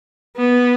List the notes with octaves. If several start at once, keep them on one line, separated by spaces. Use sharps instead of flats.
B3